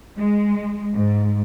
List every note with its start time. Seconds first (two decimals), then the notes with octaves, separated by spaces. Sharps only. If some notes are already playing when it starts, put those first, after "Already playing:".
0.18 G#3
0.95 G#2